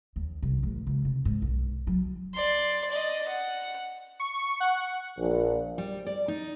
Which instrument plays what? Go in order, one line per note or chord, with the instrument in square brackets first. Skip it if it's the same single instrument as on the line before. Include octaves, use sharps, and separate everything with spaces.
[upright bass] D#2
C2
A1
C#2
C3
G#2
B1
F#3
[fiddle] D5 C6
D5 D#5
F#5
[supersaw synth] C#6
F#5
[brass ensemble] A#1
[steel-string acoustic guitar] G3
D5
D#4